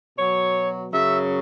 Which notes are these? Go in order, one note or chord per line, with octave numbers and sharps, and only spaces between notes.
B2 F#3 C#5
F#2 C#3 F#3 E5